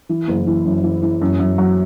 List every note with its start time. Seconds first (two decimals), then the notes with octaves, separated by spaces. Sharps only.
0.09 E3
0.28 F#1
0.47 E3
0.65 F#2
0.83 E3
1.02 E3
1.21 F#2
1.39 F#2
1.58 F#3